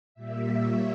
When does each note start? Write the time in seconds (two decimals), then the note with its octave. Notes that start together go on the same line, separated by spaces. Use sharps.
0.14 A#2 G3 A#3 E5
0.60 C#5